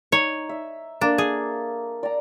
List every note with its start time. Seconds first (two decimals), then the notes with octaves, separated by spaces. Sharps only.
0.12 D#4 C#5
0.49 E5
1.01 A#3 D4 A4
1.18 G#4
2.03 D5 A#5